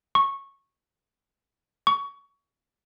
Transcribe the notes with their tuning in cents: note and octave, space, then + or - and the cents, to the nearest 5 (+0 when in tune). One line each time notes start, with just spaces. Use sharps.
C#6 -15
C#6 +20